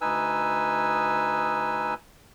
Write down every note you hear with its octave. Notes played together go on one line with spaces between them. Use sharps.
D2 D#4 B4 G#5 E6